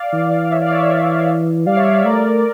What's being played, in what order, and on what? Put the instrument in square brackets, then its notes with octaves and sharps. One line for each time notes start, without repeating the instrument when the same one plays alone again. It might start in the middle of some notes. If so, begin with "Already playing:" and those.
Already playing: [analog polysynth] D5 F5
[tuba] E3
[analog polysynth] F5
C#5 E5
D5 F5
C#5 E5
C#5 E5
[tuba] G3 [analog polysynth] D5 F5
[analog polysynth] C#5 E5
D5 F5
C#5 E5
[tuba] A3 [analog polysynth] A#4 D5